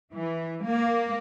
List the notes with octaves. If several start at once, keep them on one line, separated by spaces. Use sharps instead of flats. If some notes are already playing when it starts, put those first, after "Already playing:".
E3
A#3